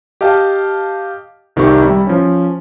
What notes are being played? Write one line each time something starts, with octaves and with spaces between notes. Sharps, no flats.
G4 D#5 F5 A5
C2 D#3 C4 E4 G4 C#6
G3 E4
F3 C#4